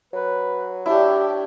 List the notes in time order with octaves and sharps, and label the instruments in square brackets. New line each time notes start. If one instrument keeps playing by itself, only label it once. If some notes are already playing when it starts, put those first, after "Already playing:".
[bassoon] F#3 [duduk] B4
[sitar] A2 D4 [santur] E4 [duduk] G4